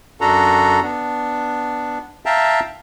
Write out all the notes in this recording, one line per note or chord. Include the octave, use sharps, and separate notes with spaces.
F#2 D4 F#4 A4 A#5
B3 D4
E5 F5 G5 A5 A#5